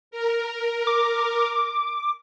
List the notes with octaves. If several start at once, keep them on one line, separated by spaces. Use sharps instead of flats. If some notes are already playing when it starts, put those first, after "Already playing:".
A#4
D6